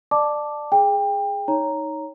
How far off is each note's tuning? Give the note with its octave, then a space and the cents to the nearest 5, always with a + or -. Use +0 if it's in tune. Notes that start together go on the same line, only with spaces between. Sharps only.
D5 +20 A5 +0 D6 +0
G#4 +0 G5 +25
D#4 +5 C#5 +5 A#5 +0